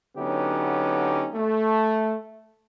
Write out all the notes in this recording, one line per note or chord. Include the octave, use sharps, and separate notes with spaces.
D3 F#3 B3 C#4 D#4 G4
A3